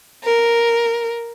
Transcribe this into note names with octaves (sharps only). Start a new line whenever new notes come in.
A#4